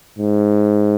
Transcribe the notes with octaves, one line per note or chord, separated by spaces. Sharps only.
G#2